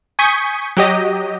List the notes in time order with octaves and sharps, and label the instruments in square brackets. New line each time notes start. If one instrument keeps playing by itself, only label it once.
[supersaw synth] G#5 C#6 D#6 G6 B6
F#3 G4 D#5